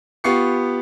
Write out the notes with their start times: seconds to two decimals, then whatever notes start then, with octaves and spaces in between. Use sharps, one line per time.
0.24 B3 F4 G4 C#6 C7 C#7